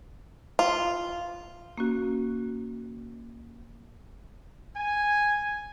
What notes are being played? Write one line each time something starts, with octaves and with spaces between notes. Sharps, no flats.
F4
A#3 C#4 F#4
G#5